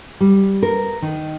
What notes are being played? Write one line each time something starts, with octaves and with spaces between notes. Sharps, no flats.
G3
A#4
D#3